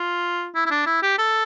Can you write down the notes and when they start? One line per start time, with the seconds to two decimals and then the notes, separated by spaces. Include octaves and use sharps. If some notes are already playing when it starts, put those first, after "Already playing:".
Already playing: F4
0.55 E4
0.66 E4
0.71 D4
0.86 E4
1.03 G4
1.18 A4